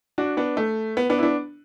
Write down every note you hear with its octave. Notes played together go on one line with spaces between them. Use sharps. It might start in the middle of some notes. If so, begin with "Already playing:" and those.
D4 F#4
B3 D4
A3
B3
B3 D4
E4
B3 D4